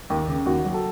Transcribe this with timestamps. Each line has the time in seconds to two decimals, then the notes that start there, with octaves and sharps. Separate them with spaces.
0.10 D#2
0.28 C#3
0.46 D#2 F#4
0.65 F#3
0.74 A4